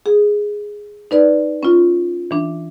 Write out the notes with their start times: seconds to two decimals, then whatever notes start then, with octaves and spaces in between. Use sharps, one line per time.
0.06 G#4
1.11 D#4 B4 D5
1.63 C#4 F4
2.31 E3 D4